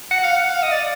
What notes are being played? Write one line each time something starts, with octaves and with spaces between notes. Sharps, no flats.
F#5
F5
F#5
F5
D#5
D5